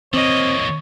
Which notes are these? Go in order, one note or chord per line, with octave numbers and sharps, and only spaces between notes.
E3 A#3 C4 C#5 D#5